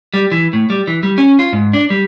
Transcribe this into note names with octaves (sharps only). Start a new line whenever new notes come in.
G3
E3
A2
G3
E3
G3
C#4
F4
G#2
D4
G3